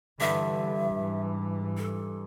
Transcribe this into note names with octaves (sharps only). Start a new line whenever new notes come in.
G2 D3 E3 E5
G#2 E3
A4